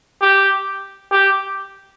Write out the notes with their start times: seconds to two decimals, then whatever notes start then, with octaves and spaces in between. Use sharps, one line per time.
0.21 G4
1.11 G4